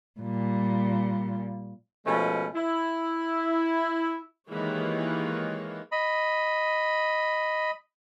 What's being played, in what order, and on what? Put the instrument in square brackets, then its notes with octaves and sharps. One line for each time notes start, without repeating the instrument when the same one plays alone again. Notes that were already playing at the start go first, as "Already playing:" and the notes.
[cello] A#2 G3
[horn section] B2 F3 G#3 A3 C#4
E4
[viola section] D#3 E3 G#3 A#3 G4 C#5
[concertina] D#5 B5